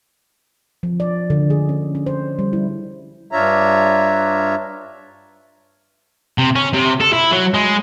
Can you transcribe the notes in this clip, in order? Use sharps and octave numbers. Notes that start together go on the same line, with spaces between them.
F3
D5
D3
G#4
C#4
C#4
C5
G3
E4
G2 D4 F4 C#5 E5 A#5
C3
C#4
C3
A4
E4
F#3
G#3